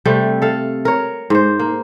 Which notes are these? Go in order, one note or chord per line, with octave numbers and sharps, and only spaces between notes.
C3 G3 A3
A4 F5
A#4 C#5
G#2 C5
A#3